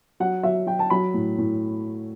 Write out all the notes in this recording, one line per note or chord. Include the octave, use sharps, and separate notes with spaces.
F#3 F#5
F#3 E5
F#3 G5
A5
F#3 B5
A2
A2